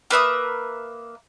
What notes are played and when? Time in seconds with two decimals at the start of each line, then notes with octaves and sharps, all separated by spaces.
0.11 A#3 B4 E5 D#6